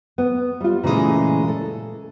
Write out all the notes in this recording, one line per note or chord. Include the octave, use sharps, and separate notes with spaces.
B3
G3 F4
A#2 C#3 E3 F#3 G#3 A3
A4